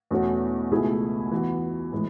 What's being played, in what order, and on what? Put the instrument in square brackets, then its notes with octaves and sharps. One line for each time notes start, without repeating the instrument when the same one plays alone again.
[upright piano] E2 B2 A3 C#4 F#4
C#2 B2 A3 E4 G#4
E3 B3 F#4
A2 E3 G#3